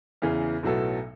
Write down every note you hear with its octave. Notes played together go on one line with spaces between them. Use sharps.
E2 C#3 E3
B1 A2 F#3 B3 A4